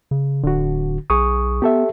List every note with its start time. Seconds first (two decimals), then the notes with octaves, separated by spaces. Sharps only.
0.11 C#3
0.44 D1 D3 F#4
1.10 B1 G#4 C#6 D#6
1.62 B3 G4 A4 E5